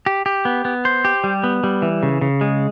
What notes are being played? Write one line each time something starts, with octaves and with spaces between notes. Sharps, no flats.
G4
G4
B3
B3
C5
G4
G3
B3
G3
E3
C#3
C#3
G#3